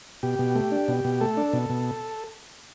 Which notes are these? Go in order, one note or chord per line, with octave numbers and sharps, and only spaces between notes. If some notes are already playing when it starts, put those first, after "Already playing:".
B2 G4
B2
A3
D4
B2
B2
A3 A4
D4
B2
B2